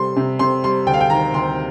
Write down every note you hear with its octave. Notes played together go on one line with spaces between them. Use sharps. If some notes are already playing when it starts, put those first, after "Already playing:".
Already playing: C3 G3 C6
C3
C3 C6
G3 C6
D2 G5
F5
G5
D#3 A#5
D2 C6